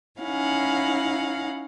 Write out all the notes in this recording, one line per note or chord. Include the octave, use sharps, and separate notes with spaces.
C#4 D#4 E4 F5 F#5